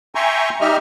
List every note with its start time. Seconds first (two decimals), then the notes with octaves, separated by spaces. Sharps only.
0.15 E5 G5 G#5 A#5 C6 C#6
0.61 G3 D#4 G4 D#5 E5 F6